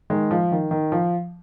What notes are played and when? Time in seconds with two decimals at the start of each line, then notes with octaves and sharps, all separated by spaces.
0.10 D#3 G#3
0.31 F3
0.52 D#3
0.71 D#3
0.92 F3